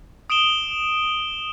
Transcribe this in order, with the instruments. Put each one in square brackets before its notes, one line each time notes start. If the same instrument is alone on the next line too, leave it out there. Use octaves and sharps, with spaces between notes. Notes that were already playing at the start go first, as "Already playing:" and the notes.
[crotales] D#6 D7 E7 G7